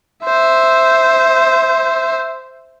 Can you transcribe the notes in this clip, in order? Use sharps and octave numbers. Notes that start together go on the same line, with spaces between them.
C5 E5